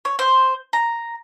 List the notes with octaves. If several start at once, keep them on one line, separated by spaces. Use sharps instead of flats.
C#5
C5
A#5